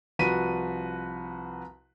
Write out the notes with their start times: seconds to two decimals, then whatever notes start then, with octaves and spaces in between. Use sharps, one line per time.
0.19 C2 F3 F#4 B4 B6 D#7